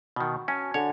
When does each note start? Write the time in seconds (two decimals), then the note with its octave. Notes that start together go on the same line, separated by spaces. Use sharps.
0.16 B2 D#3 F#4
0.48 C#4 G#5 A5
0.74 D3 C#5